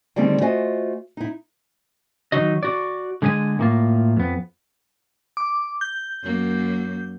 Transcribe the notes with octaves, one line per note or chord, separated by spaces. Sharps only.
D3 D#3 G3 A3 C4 G#4
A3 F4 F#4 C5 D#5 G#5
D#4 E4
D#3 F#3 D#4 F#4 D#5
F#4 D5
D3 G#3 G#4 B4 G#5
A2 A#3 F4
F2 B3
D6
G6
F#2 A#3